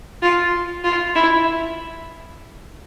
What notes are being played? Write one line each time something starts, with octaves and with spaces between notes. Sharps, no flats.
F4
F4
E4